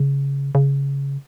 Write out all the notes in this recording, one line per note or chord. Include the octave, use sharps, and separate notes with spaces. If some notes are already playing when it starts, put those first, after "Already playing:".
Already playing: C#3
C#3